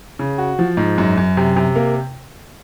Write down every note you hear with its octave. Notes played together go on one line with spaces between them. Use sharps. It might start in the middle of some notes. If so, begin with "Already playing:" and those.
C#3
F#4
F3
G#2
F#2
F#2
C3
C3
A#3